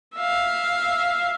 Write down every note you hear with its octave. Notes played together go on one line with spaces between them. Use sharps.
E5 F5